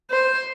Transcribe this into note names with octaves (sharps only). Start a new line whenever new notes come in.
C5